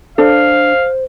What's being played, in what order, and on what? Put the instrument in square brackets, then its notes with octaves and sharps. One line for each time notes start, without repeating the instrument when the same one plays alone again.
[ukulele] D4 [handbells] A4 [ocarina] C5 [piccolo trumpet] F5